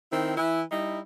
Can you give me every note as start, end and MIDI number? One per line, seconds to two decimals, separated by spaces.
0.12 0.35 51
0.12 0.35 60
0.12 0.35 64
0.37 0.62 52
0.37 0.62 64
0.71 1.00 55
0.71 1.00 63
0.71 1.00 64